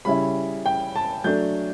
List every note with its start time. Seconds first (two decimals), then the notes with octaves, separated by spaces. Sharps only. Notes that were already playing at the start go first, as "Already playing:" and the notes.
0.05 C#3 G3 C#4 E4 B5
0.66 G5
0.96 A5
1.24 F#3 A3 D4 G6